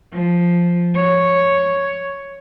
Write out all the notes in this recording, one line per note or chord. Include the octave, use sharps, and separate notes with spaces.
F3
C#5